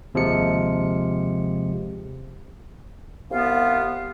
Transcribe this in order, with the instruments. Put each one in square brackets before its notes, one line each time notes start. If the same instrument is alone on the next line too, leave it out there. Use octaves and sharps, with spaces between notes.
[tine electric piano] D#2 C3 F3 G#3 C#7
[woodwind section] C2 B3 F4 F5